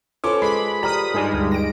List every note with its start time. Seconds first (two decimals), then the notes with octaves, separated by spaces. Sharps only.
0.24 C#4 F4 A4 B4 C5 D6 D#6
0.42 G#3 B5
0.83 G3 G5 A#5 B5 D#6 F6
1.14 G2 G3 G#3 D#4 G#4 D5
1.33 D2
1.51 A#6 D7